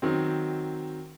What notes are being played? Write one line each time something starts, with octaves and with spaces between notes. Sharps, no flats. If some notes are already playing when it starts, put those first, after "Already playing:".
D#3 F#3 C4